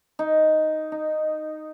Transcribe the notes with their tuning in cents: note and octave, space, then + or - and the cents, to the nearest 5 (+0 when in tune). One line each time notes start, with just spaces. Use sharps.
D#4 +0
D#4 -10